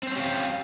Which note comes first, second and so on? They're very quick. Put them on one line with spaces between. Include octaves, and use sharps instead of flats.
C4 C5 C#4 G4 F5